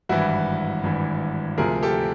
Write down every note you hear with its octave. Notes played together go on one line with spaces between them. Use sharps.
G#1 G2 E3 E4 F#4
G#1 G2 E3
D2 C3 F3 G#4 A#4
G4 A4